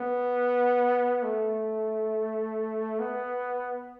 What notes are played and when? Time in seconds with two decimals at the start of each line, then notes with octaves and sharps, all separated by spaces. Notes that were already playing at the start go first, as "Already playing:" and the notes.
Already playing: B3
1.23 A3
2.99 B3